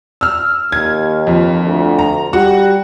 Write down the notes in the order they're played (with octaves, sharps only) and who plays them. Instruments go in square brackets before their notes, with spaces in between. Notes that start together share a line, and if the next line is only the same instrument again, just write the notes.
[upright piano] E6 F6
[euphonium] D#2 [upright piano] G#6
[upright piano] F2
[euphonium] D2
[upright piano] A#5
[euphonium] G3 [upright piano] F#4